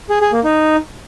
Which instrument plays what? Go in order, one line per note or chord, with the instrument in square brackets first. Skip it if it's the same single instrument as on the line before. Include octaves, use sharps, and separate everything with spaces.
[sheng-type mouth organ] G#4
G#4
A#3
D#4